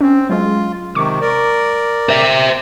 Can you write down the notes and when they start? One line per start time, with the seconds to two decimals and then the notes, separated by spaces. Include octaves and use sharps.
0.01 C4 C#4
0.30 F#3 G#3 F4
0.95 C3 D#3 C#6 D6
1.21 A#4 D5
2.09 C5 E5